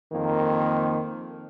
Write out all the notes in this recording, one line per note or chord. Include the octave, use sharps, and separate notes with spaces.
F2 D#3 A#3